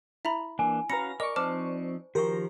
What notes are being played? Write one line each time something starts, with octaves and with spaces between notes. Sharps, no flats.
E4 E5 A#5 B5
E3 A#3 D4 G#5
C#4 F#4 B4 F5 A#5 B5 A#6 C#7
A#4 D5 D#5 C#6 D6
F3 C4 D#4 C5 A5 D6 F6
D#3 F3 F#4 G4 A#4 A#5 C#6